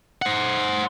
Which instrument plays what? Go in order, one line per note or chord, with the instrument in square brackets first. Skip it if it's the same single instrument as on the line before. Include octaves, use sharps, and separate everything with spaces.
[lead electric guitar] C5 F#5